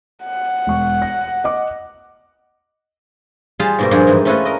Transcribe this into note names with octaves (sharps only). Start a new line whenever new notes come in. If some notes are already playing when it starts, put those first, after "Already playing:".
F#5
E1 C#6
A#6
D#5 D6
G3 F4 G#4 F5 G#5 A5
G#2 B2 A#3
G2 A#2 F3 G#4 C6
G#2 E3
A3 C#4 E4 F4 B4 D#5
A#4 D#5